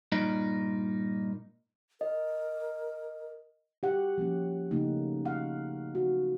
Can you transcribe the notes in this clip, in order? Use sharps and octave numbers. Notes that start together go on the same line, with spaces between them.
G2 A#2 D#4
A#4 D#5
G4 F#5
F3 A#3 C#4
C#3 A3 A#3 D#4
F5 F#5
F#4